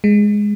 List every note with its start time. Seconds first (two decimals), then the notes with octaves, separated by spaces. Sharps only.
0.04 G#3